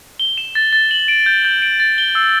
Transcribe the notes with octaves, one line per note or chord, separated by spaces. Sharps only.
G7
E7
A6
A6
F#7
D7
G6
G6
D7
A6
G7
E6